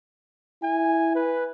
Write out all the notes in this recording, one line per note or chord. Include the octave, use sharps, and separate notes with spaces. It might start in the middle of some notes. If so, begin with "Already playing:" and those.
E4 G#5
B4